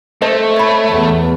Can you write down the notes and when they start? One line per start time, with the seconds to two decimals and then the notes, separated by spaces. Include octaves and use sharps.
0.22 A3 C5 D#5 A5
0.56 C#5 B5
0.90 E2 B3